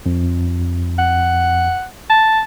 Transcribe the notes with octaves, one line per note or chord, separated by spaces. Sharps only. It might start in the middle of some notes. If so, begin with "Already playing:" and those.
F2
F#5
A5